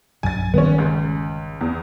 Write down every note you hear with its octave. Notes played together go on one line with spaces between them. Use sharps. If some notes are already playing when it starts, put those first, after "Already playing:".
B1 G2 F#3 G#5 A6
G1 D#3 G3 B3 C#4
C#2
E2